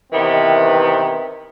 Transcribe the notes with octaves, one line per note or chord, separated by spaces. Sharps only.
C3 D#3 E3 B3 C4